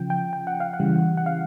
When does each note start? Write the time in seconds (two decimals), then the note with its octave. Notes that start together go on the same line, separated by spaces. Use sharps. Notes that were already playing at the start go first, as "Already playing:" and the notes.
Already playing: C#3 F3 G5
0.10 G5
0.33 G5
0.47 F#5
0.60 F5
0.74 F#5
0.79 C#3 E3 G3
1.17 F#5
1.26 F5